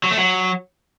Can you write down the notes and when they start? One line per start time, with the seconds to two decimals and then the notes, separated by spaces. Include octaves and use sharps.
0.04 F#3
0.11 A3
0.18 F#3